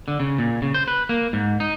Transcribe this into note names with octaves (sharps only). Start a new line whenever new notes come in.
D3
C#3
A#2
C#3
C5
B4
A#3
G#2
D#4